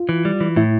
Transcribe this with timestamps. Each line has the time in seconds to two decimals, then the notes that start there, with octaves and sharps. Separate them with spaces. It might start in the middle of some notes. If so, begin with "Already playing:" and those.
Already playing: F4
0.09 E3
0.25 G3
0.41 E3
0.56 A2 E4